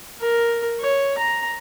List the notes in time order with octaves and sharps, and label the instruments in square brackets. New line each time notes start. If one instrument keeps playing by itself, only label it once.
[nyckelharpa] A#4
C#5
A#5